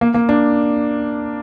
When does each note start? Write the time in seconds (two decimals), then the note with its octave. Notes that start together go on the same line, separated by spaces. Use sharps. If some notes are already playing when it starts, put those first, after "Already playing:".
0.01 A#3
0.14 A#3
0.29 D4